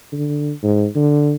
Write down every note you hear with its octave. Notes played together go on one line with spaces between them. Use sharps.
D3
G#2
D3